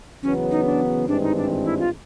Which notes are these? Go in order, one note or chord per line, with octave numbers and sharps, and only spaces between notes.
E2 C#3 F#3 B3 C#4
D#4
D4
G#1 G2 E3 G#3 C4 D4
D#4
D4
E4
F4